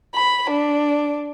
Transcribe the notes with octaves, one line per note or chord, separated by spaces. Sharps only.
B5
D4